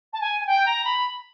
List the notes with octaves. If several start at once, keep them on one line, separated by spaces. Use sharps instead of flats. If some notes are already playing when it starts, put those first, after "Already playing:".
A5
G#5
G#5
G5
A#5
B5